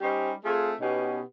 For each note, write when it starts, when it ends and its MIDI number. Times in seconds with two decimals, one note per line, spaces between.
0.01 0.32 55
0.01 0.32 61
0.01 0.32 63
0.01 0.32 67
0.01 0.32 72
0.44 0.73 57
0.44 0.73 60
0.44 0.73 65
0.44 0.73 68
0.81 1.21 47
0.81 1.21 59
0.81 1.21 61
0.81 1.21 63
0.81 1.21 67